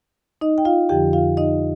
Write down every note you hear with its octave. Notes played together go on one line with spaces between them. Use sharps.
D#4 D#5
G5
F4 F5
F2 D3 F3 G4 G5
F4 F5
D#4 D#5